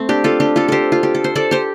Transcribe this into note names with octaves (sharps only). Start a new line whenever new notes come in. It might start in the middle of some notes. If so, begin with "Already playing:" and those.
Already playing: A3 C4
D4 G4
F4 A4
D4 G4
F4 A4
G4 A4 C5
F4
G4
A4
C5
A4 D5
G4 C5